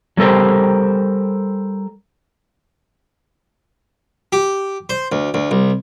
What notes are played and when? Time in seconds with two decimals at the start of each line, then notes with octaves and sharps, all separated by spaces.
0.17 F#3 G3 A4 A#4 C5
4.32 G4
4.89 C5
5.12 D2
5.34 D2
5.51 C2